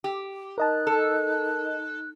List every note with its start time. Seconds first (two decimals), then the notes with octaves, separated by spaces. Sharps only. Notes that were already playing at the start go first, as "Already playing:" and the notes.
0.04 G4
0.58 D#4 A#4 D#5 A5 F#6
0.87 A4